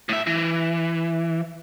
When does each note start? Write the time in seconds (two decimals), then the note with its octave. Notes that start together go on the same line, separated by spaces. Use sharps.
0.09 A2 E5
0.27 E3